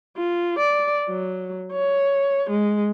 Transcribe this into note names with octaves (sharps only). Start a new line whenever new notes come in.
F4
D5
F#3
C#5
G#3